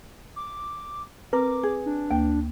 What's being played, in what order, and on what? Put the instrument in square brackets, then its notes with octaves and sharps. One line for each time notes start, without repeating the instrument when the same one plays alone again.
[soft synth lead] D6
[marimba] C4 [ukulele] A#4 [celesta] B4 [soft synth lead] D6
[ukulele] G#4
[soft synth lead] D4
[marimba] D2 A#3 [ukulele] G5